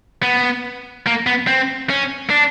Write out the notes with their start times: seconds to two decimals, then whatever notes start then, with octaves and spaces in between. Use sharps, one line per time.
0.23 B3
1.07 A#3
1.27 B3
1.47 C4
1.90 C#4
2.30 D4